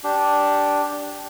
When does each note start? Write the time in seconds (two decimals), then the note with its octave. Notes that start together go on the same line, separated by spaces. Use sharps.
0.04 D4 G4